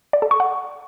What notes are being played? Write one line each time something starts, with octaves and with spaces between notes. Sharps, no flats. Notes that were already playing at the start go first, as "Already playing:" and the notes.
D5
A4
C#6
F#5